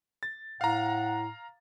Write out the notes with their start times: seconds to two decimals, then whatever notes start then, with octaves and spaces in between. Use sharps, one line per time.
0.23 A6
0.61 A2 F5 F#5 A#5